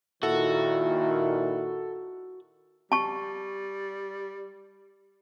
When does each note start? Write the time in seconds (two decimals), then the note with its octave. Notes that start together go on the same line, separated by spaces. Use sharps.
0.23 A#2 D#3 E4 F#4 A4
2.92 G3 A5 C#6